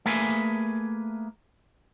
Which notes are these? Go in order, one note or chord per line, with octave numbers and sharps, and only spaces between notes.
A3 A#3 G#4 B4 G#5